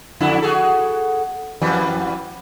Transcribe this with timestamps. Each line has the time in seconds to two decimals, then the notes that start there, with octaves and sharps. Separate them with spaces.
0.21 F2 D3 E4
0.42 F#4 G#4 A4
1.62 F2 E3 G3